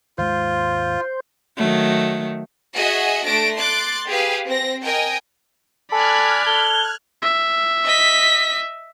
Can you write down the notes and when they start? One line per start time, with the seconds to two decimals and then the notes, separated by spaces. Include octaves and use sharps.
0.18 D#2 G#2 G#3 F4 C5
1.56 D#3 F#3 A3
2.76 F#4 G#4 D#5 E5 F#5
3.25 A3 D4 A5 A#6 D7
3.58 C6 D6 F#6 A6
4.08 G4 G#4 B4 F5
4.47 C4 A#6
4.84 A#4 D#5 G5 G#5
5.92 A4 D5 G#5 B5 F6 F#6 G#6
6.46 A4 G7
7.22 E5
7.85 D#5 B6